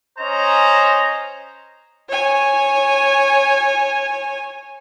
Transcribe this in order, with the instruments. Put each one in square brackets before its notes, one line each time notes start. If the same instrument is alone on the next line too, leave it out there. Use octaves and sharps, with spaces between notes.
[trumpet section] C#4 C5 D#5 A#5
[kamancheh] C#5 G#5